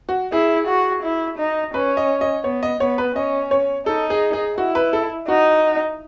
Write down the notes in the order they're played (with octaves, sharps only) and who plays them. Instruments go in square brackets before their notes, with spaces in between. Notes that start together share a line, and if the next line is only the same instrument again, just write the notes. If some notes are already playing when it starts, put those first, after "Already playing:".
[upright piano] F#4
[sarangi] E4 [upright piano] G#4
[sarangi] F#4
E4
D#4
[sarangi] C#4 [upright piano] B4
[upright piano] D#5
D#5
[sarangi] B3 [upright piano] C#5
[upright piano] D#5
[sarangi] B3 [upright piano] C#5
[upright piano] B4
[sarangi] C#4 [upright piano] D#5
[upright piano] C#5
[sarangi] D#4 [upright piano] A4
[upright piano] G#4
G#4
[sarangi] E4 [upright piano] F#4
[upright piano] B4
A4
[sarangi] D#4 [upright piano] F#4